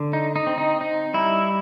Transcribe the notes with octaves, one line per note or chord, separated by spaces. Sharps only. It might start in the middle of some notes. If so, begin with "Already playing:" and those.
Already playing: D3
D#4
D#4
C4
D#4
D#4
G3 E4